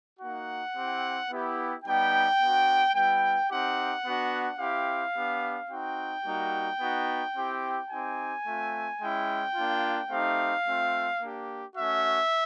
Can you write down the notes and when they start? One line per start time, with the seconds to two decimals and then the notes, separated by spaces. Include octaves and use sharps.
0.19 A#3 D#4 F#4 F#5
0.74 C4 E4 G4
1.29 B3 E4 G4
1.84 G3 B3 D#4 G4 G5
2.40 B3 D4 F#4
2.94 G3 B3 E4 G5
3.50 C4 D#4 G4 F#5
4.05 B3 D4 F#4
4.60 C4 E4 G4 F5
5.14 B3 D4 G4
5.69 C4 D#4 F#4 G5
6.25 G3 A#3 D#4 F#4
6.80 B3 D#4 F#4
7.35 C4 E4 G4
7.90 C4 D#4 G4 G#5
8.45 A3 C4 F4
9.00 G#3 C#4 E4 G5
9.55 A#3 D4 F4
10.10 A3 C4 D#4 G4 F5
10.65 A3 C4 F4
11.20 A#3 D4 G4
11.75 A3 C#4 F#4 E5